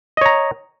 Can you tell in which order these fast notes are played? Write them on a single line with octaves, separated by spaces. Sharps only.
D#5 C#5 A#5